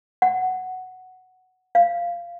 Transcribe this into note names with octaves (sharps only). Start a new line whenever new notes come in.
F#5
F5